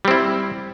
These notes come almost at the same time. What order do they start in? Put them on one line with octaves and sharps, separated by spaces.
G3 C4 E4